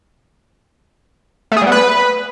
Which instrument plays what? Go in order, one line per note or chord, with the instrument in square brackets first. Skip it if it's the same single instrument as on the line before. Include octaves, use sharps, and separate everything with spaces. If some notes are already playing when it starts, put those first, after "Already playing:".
[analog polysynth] A3
G#4
G3
B3
B4